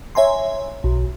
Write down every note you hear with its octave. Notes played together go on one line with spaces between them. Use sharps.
C#5 E5 G#5 A#5 C6
B1